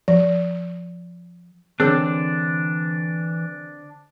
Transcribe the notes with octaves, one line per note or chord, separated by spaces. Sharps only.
F3
D3 E3 C4 D4 G#4 A#4 C#5